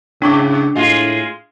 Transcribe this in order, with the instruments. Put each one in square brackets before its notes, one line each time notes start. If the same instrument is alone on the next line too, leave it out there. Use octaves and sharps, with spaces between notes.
[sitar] G#2 [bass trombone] C#3 [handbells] D4 C#6 D6
[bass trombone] A2 [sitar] G#3 F4